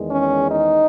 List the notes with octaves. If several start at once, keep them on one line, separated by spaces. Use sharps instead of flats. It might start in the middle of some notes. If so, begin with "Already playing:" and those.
Already playing: E2 D#3 G#3
C#4
D#4